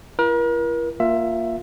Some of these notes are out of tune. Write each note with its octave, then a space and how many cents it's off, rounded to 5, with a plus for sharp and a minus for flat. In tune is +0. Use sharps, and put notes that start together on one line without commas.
E4 +45 A#4 +40
A#3 +5 F4 +0 E5 +15